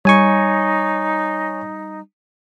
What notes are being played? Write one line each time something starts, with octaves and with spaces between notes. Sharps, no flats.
G3 D#4 C#5 G#5 C#6